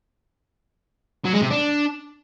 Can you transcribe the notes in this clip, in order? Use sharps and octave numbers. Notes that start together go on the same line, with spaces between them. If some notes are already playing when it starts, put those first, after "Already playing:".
F#3
G#3
C3
D4